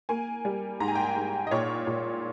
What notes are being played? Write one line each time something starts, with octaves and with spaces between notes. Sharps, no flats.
A#3 G#5
G3
G#2 A#5
G#5
G5
G#5
G#2
D#5
A#2 C#5
A#2